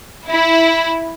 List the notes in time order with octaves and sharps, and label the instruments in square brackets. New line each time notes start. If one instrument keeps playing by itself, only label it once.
[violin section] E4